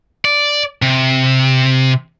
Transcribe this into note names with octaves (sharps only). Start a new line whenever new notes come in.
D5
C3